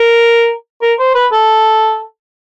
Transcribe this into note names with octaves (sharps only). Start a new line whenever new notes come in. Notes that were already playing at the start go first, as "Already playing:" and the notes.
Already playing: A#4
A#4
C5
B4
A4